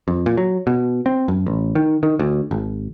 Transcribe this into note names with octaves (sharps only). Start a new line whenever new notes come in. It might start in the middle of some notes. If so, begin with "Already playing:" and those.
F2
A#2
F#3
B2
C4
F#2
A1
D#3
D#3
D2
G#1